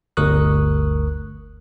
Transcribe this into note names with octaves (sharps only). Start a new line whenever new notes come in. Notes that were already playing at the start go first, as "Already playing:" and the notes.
G1 D2 A#4 C#6 D#6 F#6